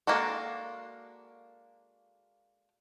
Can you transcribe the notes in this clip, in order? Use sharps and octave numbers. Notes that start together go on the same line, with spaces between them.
G#3 A#3 D4 F#4 A4